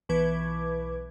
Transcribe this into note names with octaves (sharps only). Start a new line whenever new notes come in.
B1 E3 B4 D6 G#6